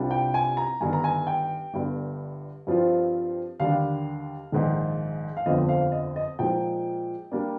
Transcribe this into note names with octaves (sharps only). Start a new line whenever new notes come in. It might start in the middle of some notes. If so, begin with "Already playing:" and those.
Already playing: C2 C3 G3 D4 F4
G5
G#5
A#5
G1 G2 D#3 G#5
A#5
G#5
G5
G1 G2 D3
G2 F3 C4 F4
D#2 D3 G3 D4 F5
A#1 G#2 D#3
F5
G1 F2 D3 F3 C4 D#5
F5
D#5
D#5
A#2 F3 G#3 D#4 G5
G3 A#3 D4